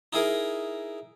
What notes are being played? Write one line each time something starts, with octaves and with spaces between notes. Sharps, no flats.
D#4 E4 G#4 A#4